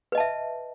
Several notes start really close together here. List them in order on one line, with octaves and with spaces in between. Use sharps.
B4 D#5 A5 E5